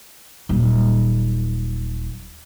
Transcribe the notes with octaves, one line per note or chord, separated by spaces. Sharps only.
D#1 F#3